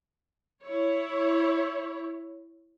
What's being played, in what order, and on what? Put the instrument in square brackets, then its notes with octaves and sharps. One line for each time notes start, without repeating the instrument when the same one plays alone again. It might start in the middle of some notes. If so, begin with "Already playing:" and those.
[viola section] E4 C#5